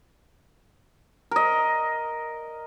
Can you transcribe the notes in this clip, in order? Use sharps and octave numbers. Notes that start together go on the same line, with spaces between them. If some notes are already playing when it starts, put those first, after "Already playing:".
A#4 D#5